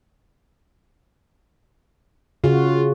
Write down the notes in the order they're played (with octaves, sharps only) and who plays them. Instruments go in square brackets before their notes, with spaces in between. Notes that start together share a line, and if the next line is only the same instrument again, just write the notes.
[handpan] C#3 F#4 [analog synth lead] F4